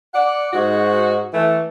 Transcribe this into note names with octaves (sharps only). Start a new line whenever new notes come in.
D5 F#5
G#2 F#4
E3 A3